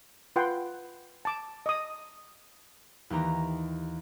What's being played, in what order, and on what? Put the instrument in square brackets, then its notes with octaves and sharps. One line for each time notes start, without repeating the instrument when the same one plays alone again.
[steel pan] F4 B4 F#5 G5 C6
A5 D6
D#5 D6 D#6
[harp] D#2 E3 G4 A#5